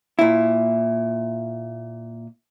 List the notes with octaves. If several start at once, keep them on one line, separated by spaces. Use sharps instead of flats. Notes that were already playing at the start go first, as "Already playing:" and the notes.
A#2 E4